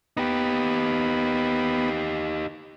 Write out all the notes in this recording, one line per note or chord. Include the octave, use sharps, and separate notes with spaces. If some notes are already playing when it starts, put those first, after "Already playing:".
B3 D#4 G4